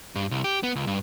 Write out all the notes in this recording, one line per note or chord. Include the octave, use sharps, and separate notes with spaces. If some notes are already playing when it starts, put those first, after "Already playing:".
G2
C2
G4
B3
C#2
G2